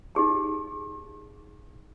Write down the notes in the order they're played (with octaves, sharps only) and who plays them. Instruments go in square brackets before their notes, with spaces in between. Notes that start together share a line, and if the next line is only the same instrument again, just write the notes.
[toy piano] D#4 G4 G#4 A5